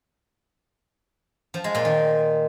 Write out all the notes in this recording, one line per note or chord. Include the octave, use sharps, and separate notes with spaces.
F3
G#3
A#2
D#3